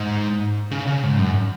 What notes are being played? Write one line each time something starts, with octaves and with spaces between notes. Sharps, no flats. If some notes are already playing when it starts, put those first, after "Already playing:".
Already playing: G#2
C#3
C#3
G#2
F#2